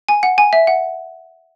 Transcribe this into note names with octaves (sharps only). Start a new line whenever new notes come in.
G#5
F#5
G#5
E5
F#5